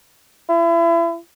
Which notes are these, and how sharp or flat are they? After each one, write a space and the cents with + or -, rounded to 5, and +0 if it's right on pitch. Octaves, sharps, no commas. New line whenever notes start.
E4 +35